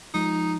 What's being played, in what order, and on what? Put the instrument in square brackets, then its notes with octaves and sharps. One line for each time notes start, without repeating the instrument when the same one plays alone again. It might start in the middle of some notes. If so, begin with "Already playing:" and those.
[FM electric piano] F3 G#3 [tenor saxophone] D#4